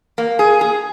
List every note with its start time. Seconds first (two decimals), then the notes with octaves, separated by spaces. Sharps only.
0.18 A#3
0.39 G#4
0.61 G#4